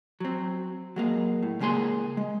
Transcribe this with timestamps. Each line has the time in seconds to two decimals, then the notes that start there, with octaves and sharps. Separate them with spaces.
0.20 F#3 C4
0.96 F#3 G#3 A#3
1.43 A2
1.60 C#3 G#3 A#3 G#4 C6
2.17 G#3